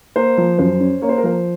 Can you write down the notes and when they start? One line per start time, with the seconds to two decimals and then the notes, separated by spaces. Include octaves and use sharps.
0.16 A#3 C5
0.38 F3
0.58 F#2 C5
0.80 C#4
1.02 A#3 C#5
1.09 C5
1.17 A#4
1.24 F3 C5